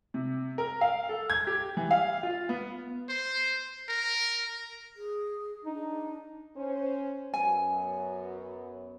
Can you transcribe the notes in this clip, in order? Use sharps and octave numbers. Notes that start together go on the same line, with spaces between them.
C3
A#4
F5
A4
G#6
G4
E3
F5
F4
B3
C5
A#4
G#4
D4 D#4
C#4 C5
F#2 F#3 B3 G#5